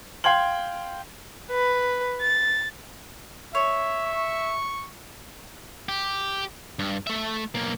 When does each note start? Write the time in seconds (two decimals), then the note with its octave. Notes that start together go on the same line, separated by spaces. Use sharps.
0.24 F5 G5 C6 G#6 F#7
1.50 B4
2.21 A6
3.55 C#5 E5
4.03 C#6
5.89 G4
6.79 G2
7.07 A3 E5
7.55 B1 A#3